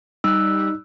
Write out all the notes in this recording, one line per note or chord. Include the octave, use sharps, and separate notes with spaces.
G3 D#4 E6 F#6